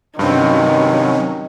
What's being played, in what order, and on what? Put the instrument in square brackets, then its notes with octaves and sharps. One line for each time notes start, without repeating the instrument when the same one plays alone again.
[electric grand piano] G2 C4 [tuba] C3 [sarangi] D#3 [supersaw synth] F#3 C#4